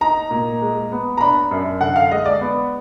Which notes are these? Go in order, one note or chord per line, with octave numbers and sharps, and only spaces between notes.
D#4 A#5
A#2
G#3
B3
A#5
D4 B5
F#2
D3 F#5
F5
G#3 D#5
D5
B3